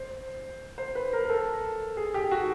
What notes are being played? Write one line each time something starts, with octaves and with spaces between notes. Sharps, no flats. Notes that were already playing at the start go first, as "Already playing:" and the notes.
Already playing: C5
C5
B4
A#4
A#4
A4
G#4
G4
F#4